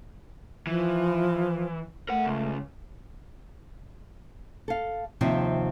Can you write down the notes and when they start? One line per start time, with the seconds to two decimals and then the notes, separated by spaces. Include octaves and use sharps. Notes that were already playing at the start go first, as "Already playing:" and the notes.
0.67 E3 F3
2.09 A3 A#4 F#5
2.25 C#2
4.68 A4 F5
5.21 D#2 C3 F3 C4 C5 E5